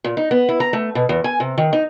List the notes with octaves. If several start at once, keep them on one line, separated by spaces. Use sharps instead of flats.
A#2
D#4
B3
E4
A#5
A3
B2
E2
G#5
C3
D#3
D#4